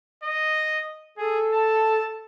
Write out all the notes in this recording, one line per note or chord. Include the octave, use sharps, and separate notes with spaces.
D#5
G#4 A4
A5